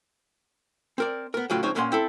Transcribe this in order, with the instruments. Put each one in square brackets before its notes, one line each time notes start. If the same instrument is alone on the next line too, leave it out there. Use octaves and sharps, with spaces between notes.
[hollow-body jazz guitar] C4 A#4 D5
B3 A#4
A2 C#3 F#3 F4 F5 G5
C#2 F3 G#3 C4 D#4 C#5
G2 A#2 A#3 C#4 F#5 C6
C4 E4 A4